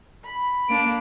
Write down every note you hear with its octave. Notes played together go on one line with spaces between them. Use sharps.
B5
A#3 D4 D7